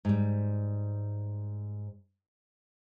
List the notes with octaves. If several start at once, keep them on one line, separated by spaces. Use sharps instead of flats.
G#2 G3